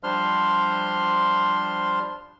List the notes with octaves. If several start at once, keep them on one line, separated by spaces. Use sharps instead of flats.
F3 G3 D4 C5 C6 F6